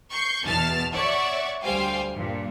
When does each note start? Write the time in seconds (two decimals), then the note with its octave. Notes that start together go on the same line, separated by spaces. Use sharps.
0.12 C#6 G6 C7
0.44 E2 B2 A5 F6 A6
0.93 C#5 D5 E5 F#5 C#6
1.63 D2 G3 C5 F5 G5 G#5
2.13 G2 A#2